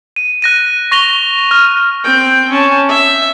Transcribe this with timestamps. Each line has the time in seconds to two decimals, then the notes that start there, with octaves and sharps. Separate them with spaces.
0.16 D#7
0.42 F#6 A#6 D#7
0.92 C#6 A#6 F7 G7
1.51 F6
2.04 C4 G5
2.51 C#4 A5
2.88 E5